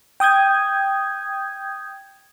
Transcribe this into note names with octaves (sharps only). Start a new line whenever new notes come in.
G5 D#6 G6 G#6